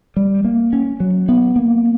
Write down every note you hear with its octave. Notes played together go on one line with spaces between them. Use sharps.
G3
A#3
C#4
F#3
B3
A#3